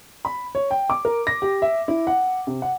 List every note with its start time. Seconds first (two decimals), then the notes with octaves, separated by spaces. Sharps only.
0.25 B5
0.55 C#5
0.71 G5
0.90 D6
1.05 A#4
1.27 A#6
1.42 G4
1.62 E5
1.88 E4
2.07 F#5
2.47 C3
2.62 F#5